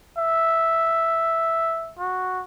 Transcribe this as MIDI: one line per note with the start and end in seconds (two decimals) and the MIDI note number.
0.18 1.93 76
1.99 2.43 66